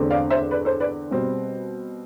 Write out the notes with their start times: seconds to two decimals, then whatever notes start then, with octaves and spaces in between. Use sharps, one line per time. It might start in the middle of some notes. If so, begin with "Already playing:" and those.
Already playing: E2 D3 A3 C4
0.10 D5 F5
0.30 C5 E5
0.51 B4 D5
0.65 A4 C5
0.80 B4 D5
1.11 B2 G3 C4